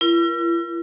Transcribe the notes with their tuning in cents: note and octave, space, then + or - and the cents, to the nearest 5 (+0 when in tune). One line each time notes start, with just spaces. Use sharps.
E4 +45 A#4 +30